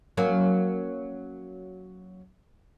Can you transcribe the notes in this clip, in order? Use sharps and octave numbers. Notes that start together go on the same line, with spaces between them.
F#3 A#3 C#4